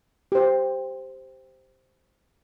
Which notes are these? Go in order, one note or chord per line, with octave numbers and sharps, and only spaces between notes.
G4 C5